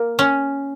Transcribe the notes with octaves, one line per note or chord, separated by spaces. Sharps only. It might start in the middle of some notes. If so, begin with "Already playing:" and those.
Already playing: A#3
C#4